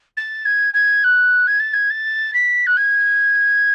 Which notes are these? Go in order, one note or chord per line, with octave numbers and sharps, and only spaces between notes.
A6
G#6
G#6
F#6
G#6
A6
G#6
A6
B6
F#6
G#6